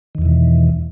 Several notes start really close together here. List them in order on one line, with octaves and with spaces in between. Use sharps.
D#3 E2 E3 B2